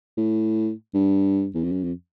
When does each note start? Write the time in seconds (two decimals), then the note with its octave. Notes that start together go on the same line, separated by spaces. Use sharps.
0.17 A2
0.94 G2
1.55 E2
1.64 F2
1.72 F#2
1.84 F2